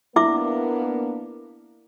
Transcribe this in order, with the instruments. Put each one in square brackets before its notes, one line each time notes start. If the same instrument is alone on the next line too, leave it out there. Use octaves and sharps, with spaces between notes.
[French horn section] A#3 B3 D4 [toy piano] E4 E5 D6